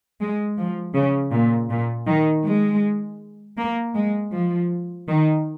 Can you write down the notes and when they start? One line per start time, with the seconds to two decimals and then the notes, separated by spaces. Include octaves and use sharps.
0.21 G#3
0.58 F3
0.95 C#3
1.32 A#2
1.70 A#2
2.08 D#3
2.46 G#3
3.57 A#3
3.96 G#3
4.33 F3
5.08 D#3